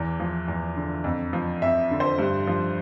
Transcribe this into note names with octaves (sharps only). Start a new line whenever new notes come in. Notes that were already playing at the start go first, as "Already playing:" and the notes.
Already playing: E2 E3
F3
E2
D3
F2
F3
F2 E5
D3
C5
G2
F3